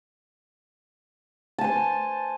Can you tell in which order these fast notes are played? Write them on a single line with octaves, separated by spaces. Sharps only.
A5 G#5 C5